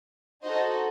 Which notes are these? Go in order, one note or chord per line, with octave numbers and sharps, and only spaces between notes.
D#4 F#4 A4 C5 D#5